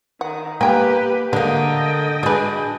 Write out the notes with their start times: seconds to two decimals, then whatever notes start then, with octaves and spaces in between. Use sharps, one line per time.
0.21 D#3 F#5
0.61 A#3 B3 G4 B4 G5 G#5
1.33 D3 G#3 A#3 D4 D#5 G5
2.23 D4 F#4 G#4 B4